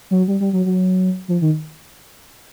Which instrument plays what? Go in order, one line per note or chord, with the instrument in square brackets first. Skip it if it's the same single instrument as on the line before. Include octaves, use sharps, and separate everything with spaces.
[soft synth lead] F#3
G3
G3
F#3
F#3
F3
D#3